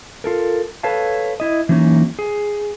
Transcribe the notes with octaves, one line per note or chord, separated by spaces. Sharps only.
F4 A4 A#4
A4 B4 C#5 F5 A5
E4 D#5
E3 F#3 A#3 C#4 D#4
G#4